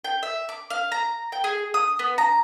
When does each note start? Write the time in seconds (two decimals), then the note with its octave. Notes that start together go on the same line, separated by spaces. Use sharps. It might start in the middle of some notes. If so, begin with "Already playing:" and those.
0.04 G5
0.23 E5
0.49 D6
0.70 F5
0.92 A#5
1.32 G5
1.44 G#4
1.74 D#6
1.99 B3
2.18 A#5